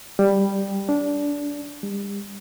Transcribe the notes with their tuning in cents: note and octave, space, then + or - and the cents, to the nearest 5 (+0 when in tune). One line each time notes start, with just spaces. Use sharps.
G3 +5
D4 -20
G3 +35